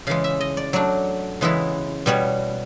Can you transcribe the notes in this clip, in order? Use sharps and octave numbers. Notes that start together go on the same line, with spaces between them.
C#3 E3 G#3 F5
E5
D#5
D5
F#3 A3 D4 D5
C#3 E3 G#3 B3 E4
B2 G3 B3 C#5